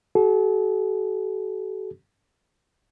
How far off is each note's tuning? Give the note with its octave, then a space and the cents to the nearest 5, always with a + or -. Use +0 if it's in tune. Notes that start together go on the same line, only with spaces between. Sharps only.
F#4 +40 A4 -40